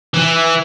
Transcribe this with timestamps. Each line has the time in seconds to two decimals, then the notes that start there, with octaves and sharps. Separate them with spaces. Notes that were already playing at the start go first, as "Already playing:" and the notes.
0.14 E3